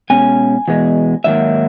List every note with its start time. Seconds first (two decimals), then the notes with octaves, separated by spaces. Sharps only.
0.10 B2 G#3 C#4 G#5
0.68 E2 B2 G#3
1.24 G#2 D#3 F#3 A#3 E5